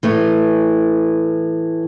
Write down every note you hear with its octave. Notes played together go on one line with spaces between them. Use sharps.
A2 E3 A3